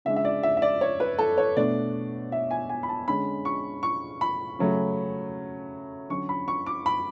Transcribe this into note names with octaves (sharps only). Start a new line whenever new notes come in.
C#3 G#3 D4 E5
E5
D5
E5
E5
D5
C#5
B4
A4
C#5
B2 A3 D4 D5
E5
G#5
G#5
B5
A5
D3 G#3 C#4 B5
C#6
C#6
B5
C#3 F#3 A3 C#4
D3 F#3 C#4 C#6
B5
C#6
D6
B5